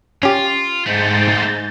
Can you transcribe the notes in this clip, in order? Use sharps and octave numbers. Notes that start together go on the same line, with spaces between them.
C#4 F4 G4
G#2 A3 C4 G6 A6